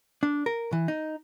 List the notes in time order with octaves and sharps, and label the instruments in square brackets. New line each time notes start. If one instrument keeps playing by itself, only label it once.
[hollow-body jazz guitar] D4
A#4
E3
D#4